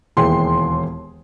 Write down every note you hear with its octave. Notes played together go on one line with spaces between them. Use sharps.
E1 D#2 E3 G#4 G5 C6